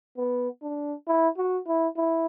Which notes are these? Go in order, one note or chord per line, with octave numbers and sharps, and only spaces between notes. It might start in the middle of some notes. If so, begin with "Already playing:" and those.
B3
D4
E4
F#4
E4
E4